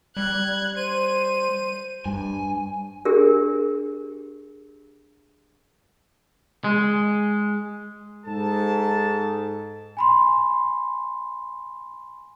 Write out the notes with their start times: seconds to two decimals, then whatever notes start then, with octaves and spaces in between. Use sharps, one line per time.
0.17 G3 F#6 G#6
0.77 C5 D#7
2.05 G2 G#5
3.05 D4 G4 G#4 A#4
6.64 G#3
8.26 G#2 A4 A5
9.97 G#5 B5 C6